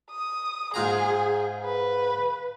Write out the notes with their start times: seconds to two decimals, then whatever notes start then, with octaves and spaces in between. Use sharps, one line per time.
0.11 D#6
0.74 G#2 F4 G#4 A#5
1.64 B4